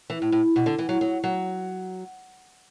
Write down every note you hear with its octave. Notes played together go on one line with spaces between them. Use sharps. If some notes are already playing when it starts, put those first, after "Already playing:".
E3
A2
A2
B2
D3
E3
F#3
F#3
F#3